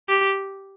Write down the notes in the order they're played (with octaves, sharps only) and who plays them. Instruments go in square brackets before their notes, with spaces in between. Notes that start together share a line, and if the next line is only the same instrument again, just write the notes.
[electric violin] G4